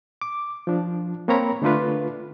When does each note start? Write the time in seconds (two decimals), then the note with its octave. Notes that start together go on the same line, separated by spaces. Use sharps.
0.21 D6
0.67 F3 D4
1.28 A#3 C4 A#4 C#5 A#5 B5
1.62 D3 A3 D4 F4 B4